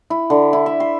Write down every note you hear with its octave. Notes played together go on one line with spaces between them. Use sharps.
E4
D3
E4
E5
C6